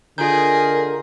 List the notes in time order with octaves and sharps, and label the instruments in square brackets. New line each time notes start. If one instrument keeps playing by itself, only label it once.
[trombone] D3 [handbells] F4 G6 [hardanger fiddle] G#4 D#5 [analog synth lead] A#4